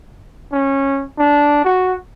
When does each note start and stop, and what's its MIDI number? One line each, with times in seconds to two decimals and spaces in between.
0.52 1.06 61
1.18 1.64 62
1.64 1.95 66